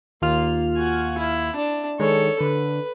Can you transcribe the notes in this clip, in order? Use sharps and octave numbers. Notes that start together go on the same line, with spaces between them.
D#2 A#3 F4 F6
F#4 G#5
E4
D4 A5
D#3 G#3 A4 C#5
D3 B4